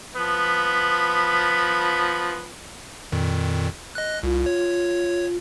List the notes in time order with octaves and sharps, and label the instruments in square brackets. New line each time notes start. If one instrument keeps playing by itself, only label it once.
[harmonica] F3 B3 B5
[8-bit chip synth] F2 A#2 D#3
D#5 F#6
[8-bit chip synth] C2 [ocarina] F4
[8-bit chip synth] C#5